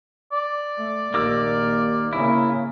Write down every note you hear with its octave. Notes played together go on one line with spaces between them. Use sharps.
D5
A3
A#1 D#2 A#3 D6 E6
C#3 A#3 E4